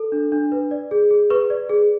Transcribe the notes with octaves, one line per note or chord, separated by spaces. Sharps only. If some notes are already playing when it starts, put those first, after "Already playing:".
Already playing: A4
D4
D4
B4
D5
G#4
G#4
B4 C#6
D5
G#4